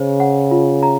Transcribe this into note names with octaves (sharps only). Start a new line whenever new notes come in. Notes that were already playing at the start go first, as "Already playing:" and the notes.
Already playing: C#3 C5
F#5
F4
A#5